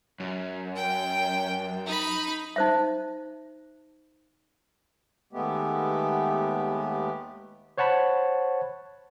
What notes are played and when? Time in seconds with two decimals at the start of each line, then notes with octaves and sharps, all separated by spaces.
0.20 F#2
0.76 G5
1.86 D#4 B5
2.56 D#4 C5 E5
5.33 D#2 G#3 A3 B3 G4
7.78 C5 C#5 F#5 A5 B5